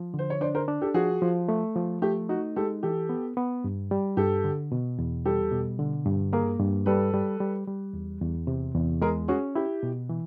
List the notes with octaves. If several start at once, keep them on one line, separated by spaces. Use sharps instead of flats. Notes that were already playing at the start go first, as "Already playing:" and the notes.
Already playing: F3
D3 C5
C#5
D4 C5 D5
A#4 C5
D4
G4 A4
F3 F#4 G#4
F3
A3
F3
A3 G4
D#4 F#4
G#3 G4 A4
E3 G4 A4
B3
B3
G2
G3
G2 G4 A4
D3
B2
E2
G3 G4 A4
B2
D3
G2
A#3 G#4 A#4
G2
G3 A4 B4
G3
G3
G3
E2
E2
C3
E2
G#3 G#4 A#4
C#4 F#4 G#4
E4 G4
B2
E3